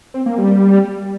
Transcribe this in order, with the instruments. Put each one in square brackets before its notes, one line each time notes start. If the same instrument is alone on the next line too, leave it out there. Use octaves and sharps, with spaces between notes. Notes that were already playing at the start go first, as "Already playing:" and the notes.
[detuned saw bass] C4
A#3
G3